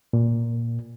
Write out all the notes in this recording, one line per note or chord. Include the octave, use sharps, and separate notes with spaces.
A#2